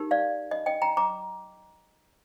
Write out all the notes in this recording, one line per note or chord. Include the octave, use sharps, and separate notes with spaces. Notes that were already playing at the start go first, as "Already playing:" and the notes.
Already playing: D#4 G4 A#4
D5 F5
D#5
D#5 G5
G5 A#5
A#5 D6